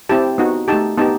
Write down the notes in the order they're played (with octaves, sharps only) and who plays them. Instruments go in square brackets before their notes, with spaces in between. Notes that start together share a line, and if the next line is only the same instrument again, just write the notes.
[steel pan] C4 E4 G4 A5
B3 D#4 F#4
A3 D#4 G4 A5
B3 D#4 G4 A5